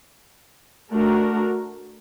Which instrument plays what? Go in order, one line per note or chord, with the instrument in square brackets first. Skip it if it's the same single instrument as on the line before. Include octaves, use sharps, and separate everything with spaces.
[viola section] A3 D4 F#4 A#4